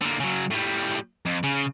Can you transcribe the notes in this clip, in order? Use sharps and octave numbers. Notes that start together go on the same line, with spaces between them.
D3 A#3
C#3 F#3
A2 G3
F2
C#3